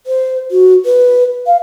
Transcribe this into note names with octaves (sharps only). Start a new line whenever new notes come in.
C5
F#4
B4
F5